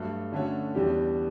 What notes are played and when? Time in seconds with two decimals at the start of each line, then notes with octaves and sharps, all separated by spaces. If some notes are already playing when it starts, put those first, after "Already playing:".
Already playing: G2 F#3 A3
0.32 D3 A3 C#4 F#4 C#5
0.74 E2 B2 G3 D4 G4